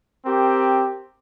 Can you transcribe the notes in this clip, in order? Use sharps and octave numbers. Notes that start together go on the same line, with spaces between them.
C4 G4 A#4